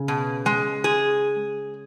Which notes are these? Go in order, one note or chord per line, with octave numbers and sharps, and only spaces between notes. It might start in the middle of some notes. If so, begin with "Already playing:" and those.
Already playing: C#3
B2
G#3
G#4